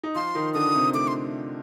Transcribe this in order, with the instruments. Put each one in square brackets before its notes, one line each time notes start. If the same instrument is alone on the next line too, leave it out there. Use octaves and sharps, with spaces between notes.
[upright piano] D#4
[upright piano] F3 F4 [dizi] C6
[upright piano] D#3 D#4
[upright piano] D3 D4 [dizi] D#6
[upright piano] C3 C4
[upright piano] A3 [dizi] D6
[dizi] C6